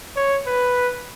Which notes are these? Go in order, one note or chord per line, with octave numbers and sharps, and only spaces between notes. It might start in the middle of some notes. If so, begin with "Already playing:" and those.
C#5
B4